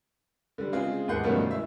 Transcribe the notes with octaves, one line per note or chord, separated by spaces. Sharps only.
D3 G3
C#3 G#3 C4 F4 G#4
D#2 G#2 D#3 F#5 G6 C7
G2 B2 D#3 F3 A3 C#4
G#3 E4 E5